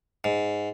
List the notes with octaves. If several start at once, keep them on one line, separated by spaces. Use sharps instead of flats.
G#2